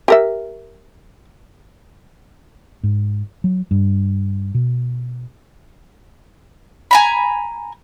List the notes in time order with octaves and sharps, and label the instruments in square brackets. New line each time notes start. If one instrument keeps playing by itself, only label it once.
[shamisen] G4 A#4 E5
[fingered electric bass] G#2
F#3
G2
B2
[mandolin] G#5 A#5 B5